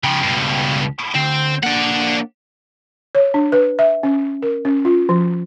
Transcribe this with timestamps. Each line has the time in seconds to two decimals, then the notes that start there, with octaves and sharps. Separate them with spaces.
0.04 C#2 C#3 F3 G5
0.23 G2 B2
1.15 D2 C4
1.63 A#3 D4 D5 F#5
3.15 C#5
3.34 D4
3.52 B4
3.79 E5
4.03 C#4
4.42 A#4
4.65 C#4
4.85 F4
5.09 F3